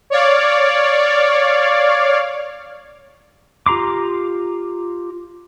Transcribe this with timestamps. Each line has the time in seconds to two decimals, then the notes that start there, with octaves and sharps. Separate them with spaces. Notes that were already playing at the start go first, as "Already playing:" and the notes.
0.10 C#5 D5 F5
3.66 F4 G4 A#5 C6 D6